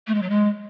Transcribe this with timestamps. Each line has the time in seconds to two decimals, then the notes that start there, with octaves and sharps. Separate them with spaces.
0.07 A3
0.15 G#3
0.22 F#3
0.30 G#3